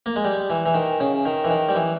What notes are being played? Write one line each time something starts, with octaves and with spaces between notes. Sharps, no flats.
A#3
G#3
G3
E3
E3
D#3
C#3
D#3
E3
D#3
G3
E3